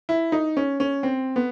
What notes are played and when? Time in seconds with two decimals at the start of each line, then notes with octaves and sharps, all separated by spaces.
0.09 E4
0.32 D#4
0.57 C#4
0.80 C#4
1.03 C4
1.36 B3